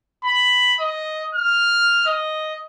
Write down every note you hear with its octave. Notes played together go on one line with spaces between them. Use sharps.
B5
D#5
F6
D#5